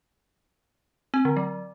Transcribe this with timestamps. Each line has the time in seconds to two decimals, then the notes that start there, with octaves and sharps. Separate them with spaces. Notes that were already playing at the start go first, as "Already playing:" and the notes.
1.14 C4
1.25 D3
1.37 F#3